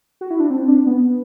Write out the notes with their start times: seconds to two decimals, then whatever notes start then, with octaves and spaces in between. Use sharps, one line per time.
0.21 F#4
0.31 E4
0.40 D4
0.50 C4
0.68 D4
0.86 B3